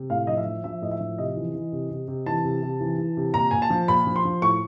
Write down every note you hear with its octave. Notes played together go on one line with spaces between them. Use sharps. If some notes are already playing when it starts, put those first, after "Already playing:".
Already playing: C3
A2 F5
F3 D#5
E5
F3
F3 E5
A2 D#5
E5
F3
C3 D#5
E3
E3
C3
C3
C3
E3 A5
C3
C3
E3
E3
C3
A#2 A#5
A#2 G#5
A5
F3
A#2 B5
F3
C6
F3
A2 C#6